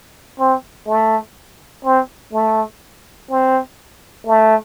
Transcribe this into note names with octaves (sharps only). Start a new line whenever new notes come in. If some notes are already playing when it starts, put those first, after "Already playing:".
C4
A3
C4
A3
C4
A3